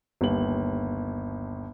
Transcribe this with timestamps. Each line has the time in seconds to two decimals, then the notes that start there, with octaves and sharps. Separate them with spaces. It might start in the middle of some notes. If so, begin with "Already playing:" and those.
0.21 G1 D#2 F#7